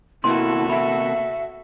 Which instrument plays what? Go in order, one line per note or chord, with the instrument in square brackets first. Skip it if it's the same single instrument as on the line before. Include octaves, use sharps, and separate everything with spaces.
[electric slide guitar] C3 A#3 B3 [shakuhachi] E4 [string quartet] F#4 A4 [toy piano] C6
[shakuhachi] E5 [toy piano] B5